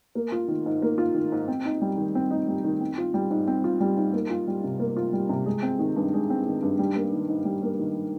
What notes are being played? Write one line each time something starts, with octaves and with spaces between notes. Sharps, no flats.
A#3
F4
D#3
G#2
A#3
F4
D#3
G#2
C4
D#4
G3
D#3
C4
D#4
G3
D#3
C4
F4
G3
G#2
C4
F4
G3
G#2
A#3
F4
G3
C3
A#3
F4
G3
C3
G#3
C4
D#3
G2
G#3
C4
D#3
G2
G3
A#3
D#3
G#2
G3
A#3
D#3